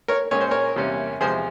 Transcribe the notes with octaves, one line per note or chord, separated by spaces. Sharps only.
A#4 C#5
A#2 G#3 C#4 C#5
C5
A#4 C#5
E2 C3 G3 A#3 C#4
E2 C3 F3 G#3 G#4 C5